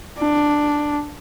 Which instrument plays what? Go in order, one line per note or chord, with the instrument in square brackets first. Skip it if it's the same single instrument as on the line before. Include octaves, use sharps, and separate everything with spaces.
[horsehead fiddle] D4